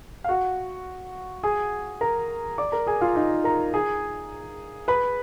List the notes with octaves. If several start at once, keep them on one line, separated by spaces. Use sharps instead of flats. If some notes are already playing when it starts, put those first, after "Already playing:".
F5
F#4 F#5
G#4 G#5
A#4 A#5
D5 D6
A#4 A#5
G#4 G#5
F4 F5
D#4 D#5
A#4 A#5
G#4 G#5
B4 B5